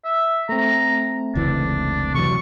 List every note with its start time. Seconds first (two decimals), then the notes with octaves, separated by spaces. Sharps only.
0.05 E5
0.49 A3 C4 A#5
1.35 F1 C#2 E3 D4
2.14 C3 E3 F#3 C#6